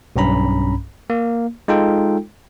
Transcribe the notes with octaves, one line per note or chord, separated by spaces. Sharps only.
B1 G2 C#4 A#5 B5
A#3
G#3 D#4 F4 A4 G5